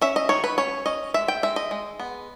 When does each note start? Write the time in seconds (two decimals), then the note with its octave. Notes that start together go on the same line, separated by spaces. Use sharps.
0.01 C#4 E5
0.16 D#5
0.29 D#3 C#5
0.44 B4
0.58 C#4 C#5
0.86 C#4 D#5
1.14 G#3 E5
1.28 G5
1.43 G#3 E5
1.56 D#5
1.71 G#3
1.99 B3